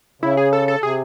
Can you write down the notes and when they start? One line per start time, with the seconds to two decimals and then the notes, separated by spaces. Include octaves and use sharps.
0.22 C#3 E4
0.37 G#4
0.53 A4
0.68 A4
0.83 C3 G#4